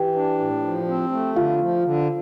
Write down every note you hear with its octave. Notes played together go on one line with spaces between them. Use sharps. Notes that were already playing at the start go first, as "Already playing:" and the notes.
Already playing: E3 G4 G5
D4
A2
F3
C4
A3
D3 F4 F5
F3
D3